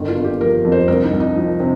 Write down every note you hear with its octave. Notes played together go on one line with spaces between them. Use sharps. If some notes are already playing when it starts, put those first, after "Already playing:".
Already playing: G1 D#3
F4
G1
G4
F3 A#4
F2
C5
C2 A#4
D#4
C2
D#4
F3
C3